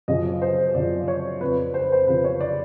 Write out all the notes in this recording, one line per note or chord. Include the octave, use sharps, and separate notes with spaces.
F#2 C#3 F3 D#5
C5
F#2 C#3 F3 D5
C#5
F2 C#3 F3 B4
C5
B4
C5
F2 C#3 F3 B4
C#5
D5